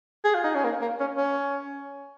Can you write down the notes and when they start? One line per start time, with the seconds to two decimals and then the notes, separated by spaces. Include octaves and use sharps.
0.24 G#4
0.34 F4
0.44 D#4
0.55 C#4
0.64 A#3
0.81 A#3
1.00 C#4
1.17 C#4